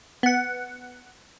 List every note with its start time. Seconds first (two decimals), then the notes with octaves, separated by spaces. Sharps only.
0.23 B3 F#5